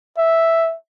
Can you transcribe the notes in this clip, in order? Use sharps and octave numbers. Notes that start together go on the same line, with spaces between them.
E5